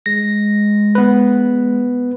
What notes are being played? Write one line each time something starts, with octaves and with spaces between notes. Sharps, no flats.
G#3 A#6
B3 B4